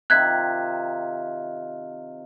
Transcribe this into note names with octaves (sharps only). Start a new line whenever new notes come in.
C3 D#3 F4 F#6 G#6 B6